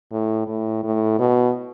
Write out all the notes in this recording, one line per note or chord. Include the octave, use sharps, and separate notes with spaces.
A2
A2
A2
B2